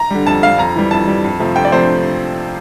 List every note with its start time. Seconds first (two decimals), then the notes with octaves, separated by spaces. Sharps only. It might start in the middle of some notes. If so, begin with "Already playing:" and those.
Already playing: A#5
0.10 D3 G3
0.26 F2 A5
0.42 D3 G3 F5
0.58 F2 A#5
0.76 E3 G3
0.91 F2 A5
1.07 E3 G3
1.24 F2
1.40 C3 F3 A3
1.56 F2 G5
1.65 D5
1.72 C3 F3 A3 C5